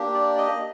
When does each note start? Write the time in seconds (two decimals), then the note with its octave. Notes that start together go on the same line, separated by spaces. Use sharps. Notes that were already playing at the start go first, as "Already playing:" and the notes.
Already playing: A#3 D4 G4
0.14 D5
0.37 D#5